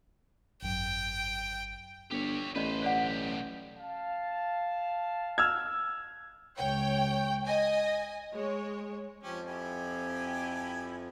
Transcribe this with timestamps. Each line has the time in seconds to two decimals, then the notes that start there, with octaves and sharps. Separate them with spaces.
0.63 G#1 F#2 G5
2.11 G1 G4 C#5
2.55 A1 B4 C5 D5 D#5
2.82 B1 G4 C5 D5 F#5
3.78 F5 A5
5.38 E6 F6 G#6
6.57 C#2 C#5 G5
7.46 D#5 G#5
8.33 G#3 C#5
9.23 F2 F3 C#4 G4
9.47 E4 G4 G#5